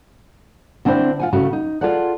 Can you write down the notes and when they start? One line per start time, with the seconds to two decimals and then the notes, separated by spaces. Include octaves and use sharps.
0.85 D3 C4 D4 E4 C5
1.20 F4 F#5 G#5
1.33 A2 C#3 A3 F#4
1.53 D#4
1.81 F4 G#4 A4 D5 F#5